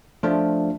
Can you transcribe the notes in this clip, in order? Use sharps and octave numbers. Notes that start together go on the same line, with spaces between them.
F3 A3 D4 F4